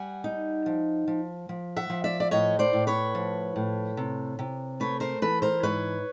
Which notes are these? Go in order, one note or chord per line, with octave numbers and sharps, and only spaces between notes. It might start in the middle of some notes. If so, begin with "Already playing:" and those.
Already playing: G3 F#5 G#5
D#4
F3
F3
F3
E5 F#5
F3
D5 E5
D5
A2 C#5 D#5
C5 D5
A2
B4 C#5
F3
A2
C3
C3
A3 B4 C#5
A#4 C5
E3 A4 B4
A#4 C5
G#2 B4 C#5